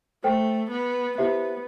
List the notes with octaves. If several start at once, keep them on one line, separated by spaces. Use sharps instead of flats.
A3 A4 C5 G5
B3
B3 E4 G4 C5 E5